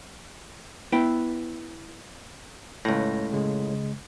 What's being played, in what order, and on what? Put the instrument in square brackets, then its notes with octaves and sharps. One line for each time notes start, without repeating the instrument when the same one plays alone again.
[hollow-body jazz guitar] B3 E4 B4 G5
[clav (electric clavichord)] C#2 A2 [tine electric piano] A#6
[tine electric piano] C#3 G#3